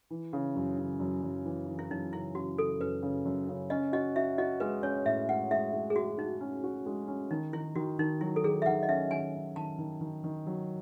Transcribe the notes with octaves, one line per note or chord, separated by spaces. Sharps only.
E3
C#3
F#2
C#3
F#2
F#2
E3
E3
E4
F#2 D#4
C#3 E4
C#3 F#4
C#3 A4
F#2 B4
C#3
F#2
C#3
C#4 D#5
F#4 D#5
F#4 E5
F#4 D#5
G#3 B4
C#4 C#5
A2 E5
G#3 F#5
G#3 E5
G#3
G#4
G#3 F#4
D#4 F#4
C#4
F#4
G#3
C#4
D#3 D#4
D#3 E4
D#3 F#4
D#3 D#4
F#3 E4
A4
D#3 G#4
E5
D#3 F#5
D#5
C#4 E5
D#3 G#5
C#4
D#3 A5
D#3
D#3
D#3
F#3